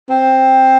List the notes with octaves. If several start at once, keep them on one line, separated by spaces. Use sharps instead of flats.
C4